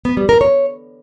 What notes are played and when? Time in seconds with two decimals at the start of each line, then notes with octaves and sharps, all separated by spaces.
0.05 B3
0.17 G3
0.29 A#4
0.41 C#5